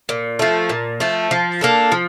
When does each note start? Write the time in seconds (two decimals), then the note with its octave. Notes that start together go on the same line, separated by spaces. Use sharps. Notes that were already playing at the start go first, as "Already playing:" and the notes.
0.09 A#2
0.39 F3 A3
0.69 A#2
1.00 F3 A3
1.31 F3
1.61 A#3 D4 A4
1.92 F3